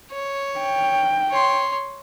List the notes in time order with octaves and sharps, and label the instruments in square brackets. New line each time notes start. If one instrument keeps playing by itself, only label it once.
[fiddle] C#5
[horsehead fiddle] G5
[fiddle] C#5 C6